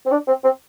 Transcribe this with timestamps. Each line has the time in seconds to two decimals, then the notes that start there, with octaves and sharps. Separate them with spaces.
0.06 C4
0.11 D4
0.28 C4
0.44 C4